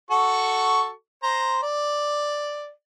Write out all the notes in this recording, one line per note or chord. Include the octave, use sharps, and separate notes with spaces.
F#4 A4 C#6
C5 A#5
D5